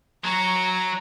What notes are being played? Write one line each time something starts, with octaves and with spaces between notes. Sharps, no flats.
F#3 F#4 A#5